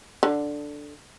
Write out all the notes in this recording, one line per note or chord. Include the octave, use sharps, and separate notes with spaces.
D3